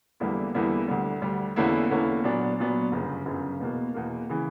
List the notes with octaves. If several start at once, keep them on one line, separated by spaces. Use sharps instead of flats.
E2 D3 G3 A#3 E4
E2 D3 G3 A#3 E4
D2 D3 G3
D2 D3 G3
E2 D3 A#3 C#4 E4
E2 D3 A#3 C#4 E4
A#2 F#3 B3 D4
A#2 F#3 B3 D4
G1 F#2 C#3
G1 F#2 C#3
E2 B2 A#3
E2 B2 A#3
C#3 E3